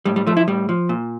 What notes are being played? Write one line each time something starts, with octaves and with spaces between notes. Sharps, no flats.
A2 G3
G3
F3 A3
E4
A2 G3
F3
A#2